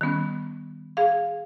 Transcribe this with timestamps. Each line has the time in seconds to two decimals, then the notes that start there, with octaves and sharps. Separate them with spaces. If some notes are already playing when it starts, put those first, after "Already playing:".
0.01 D#3 G3 B3 C#4
0.97 G#4 F5